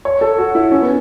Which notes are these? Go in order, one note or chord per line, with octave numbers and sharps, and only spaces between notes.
C#5
A4
F#4
E4
C#4
B3